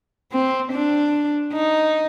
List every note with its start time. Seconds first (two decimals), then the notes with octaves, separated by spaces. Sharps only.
0.32 C4
0.72 D4
1.53 D#4